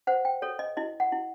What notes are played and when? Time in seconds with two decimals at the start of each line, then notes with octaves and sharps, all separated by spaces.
0.07 C5 F#5
0.25 G5
0.42 A4 C#5
0.59 D#5
0.77 E4 D#5
1.00 F#5
1.12 E4